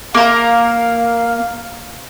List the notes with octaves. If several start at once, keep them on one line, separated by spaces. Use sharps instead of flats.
A#3 A#4 F5